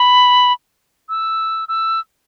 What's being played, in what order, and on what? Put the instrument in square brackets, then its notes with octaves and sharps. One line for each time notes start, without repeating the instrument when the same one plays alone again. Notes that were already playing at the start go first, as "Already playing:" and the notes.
Already playing: [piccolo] B5
E6
E6